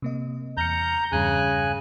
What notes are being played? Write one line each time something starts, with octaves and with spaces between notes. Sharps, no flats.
C3 A#3 D#5
E2 A#5 F6 G6 C#7
E2 G2 C#3 G#5 F#6